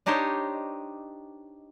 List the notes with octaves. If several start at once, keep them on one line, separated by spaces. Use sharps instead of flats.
D4 D#4 G4 C5 C#5 D#5